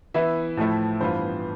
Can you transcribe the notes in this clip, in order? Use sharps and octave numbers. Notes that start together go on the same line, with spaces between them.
E3 B3 E4 E5
A2 F3 A3 E4
G2 E3 B3 F4 C5